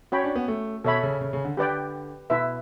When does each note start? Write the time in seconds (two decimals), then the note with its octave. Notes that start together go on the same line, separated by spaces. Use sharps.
0.12 C#4 F#4 C#5 G5 B5
0.24 D4
0.35 B3
0.48 A3
0.84 B2 A4 C#5 E5 B5
1.03 C#3
1.21 C#3
1.33 C#3
1.45 D3
1.57 D3 G4 B4 D5 G5
2.30 B2 E4 B4 E5